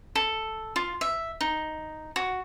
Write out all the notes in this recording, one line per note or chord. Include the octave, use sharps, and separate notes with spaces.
A4
F4
E5
D#4
F#4